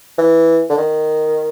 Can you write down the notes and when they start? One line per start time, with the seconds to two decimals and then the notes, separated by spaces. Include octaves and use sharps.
0.18 E3
0.69 D3
0.78 D#3